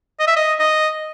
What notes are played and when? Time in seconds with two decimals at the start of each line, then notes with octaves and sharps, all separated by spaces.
0.20 D#5
0.27 E5
0.37 D#5
0.60 D#5